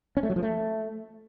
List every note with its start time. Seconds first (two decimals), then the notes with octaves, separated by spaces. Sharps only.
0.17 C#4
0.23 A3
0.30 F#3
0.36 F3
0.43 A3